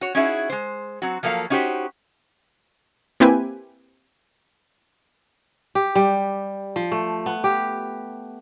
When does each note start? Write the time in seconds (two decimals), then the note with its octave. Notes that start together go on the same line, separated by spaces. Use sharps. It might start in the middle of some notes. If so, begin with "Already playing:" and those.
0.01 F#4 C#5
0.15 C#4 D#4 E4 F#4 G#4 E5
0.50 G#3 C5
1.02 F#3 C4 F#4
1.23 F3 F#3 A#3 A4 F5
1.50 C#4 D#4 F#4 G4 C5
3.20 A#3 C4 E4 G4 B4 G#5
5.75 G4
5.95 G3
6.76 F3
6.92 A3
7.26 B3
7.44 G4